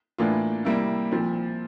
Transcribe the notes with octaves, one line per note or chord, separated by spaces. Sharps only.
A2 E3 A#3 D4 F4
C3 G3 A#3 E4
A#2 F3 C4